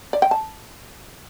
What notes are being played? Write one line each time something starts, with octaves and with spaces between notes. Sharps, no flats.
D5
G5
A5